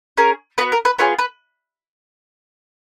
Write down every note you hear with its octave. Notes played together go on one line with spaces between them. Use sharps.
C#4 G#4 A#4
B3 F#4 B4
A#4
B4
B3 F4 G#4 C#5
B4